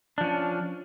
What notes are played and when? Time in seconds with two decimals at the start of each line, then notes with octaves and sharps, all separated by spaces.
0.18 D4
0.21 F3
0.24 C#4